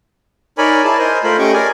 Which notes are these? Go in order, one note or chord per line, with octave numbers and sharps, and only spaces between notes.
D#4 A#4 C#5 D5 G#5 B5
E4 G#4 D5 A5
A#4 C5 D#5 G#5
A3 F4 A#4 C5 B5
A3 C#4 G4 D#5 C#6 D6
G#4 A#4 D5 G#5